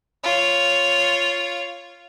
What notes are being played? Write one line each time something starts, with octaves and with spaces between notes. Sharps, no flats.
F4 C#5